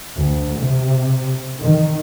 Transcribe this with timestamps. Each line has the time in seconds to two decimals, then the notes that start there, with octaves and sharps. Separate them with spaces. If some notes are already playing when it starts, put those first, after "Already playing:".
0.17 D2
0.59 C3
1.61 D#3